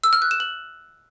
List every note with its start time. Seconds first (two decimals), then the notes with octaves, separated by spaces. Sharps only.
0.04 E6
0.13 F6
0.22 F#6
0.31 E7
0.40 F#7